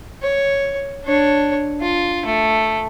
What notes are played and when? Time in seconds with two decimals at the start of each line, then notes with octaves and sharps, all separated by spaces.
0.22 C#5
1.05 D4 C#5
1.81 F4
2.26 A3